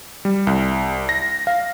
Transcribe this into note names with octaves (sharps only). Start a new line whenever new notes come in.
G3
C2
A#6
F5